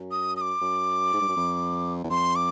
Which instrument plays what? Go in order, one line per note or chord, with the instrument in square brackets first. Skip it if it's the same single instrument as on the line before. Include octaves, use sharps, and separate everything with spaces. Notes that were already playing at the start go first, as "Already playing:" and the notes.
Already playing: [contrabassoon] F#2
[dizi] D#6
D#6
D6
[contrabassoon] F#2
G#2
G2
F#2
F2
E2
[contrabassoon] F2 [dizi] C6
[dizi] D6